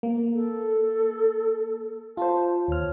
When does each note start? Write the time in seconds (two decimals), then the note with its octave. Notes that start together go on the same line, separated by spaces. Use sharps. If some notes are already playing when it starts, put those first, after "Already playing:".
0.03 A#3
0.33 A4
2.17 F4 C5 A5
2.68 D#2 C#5 F6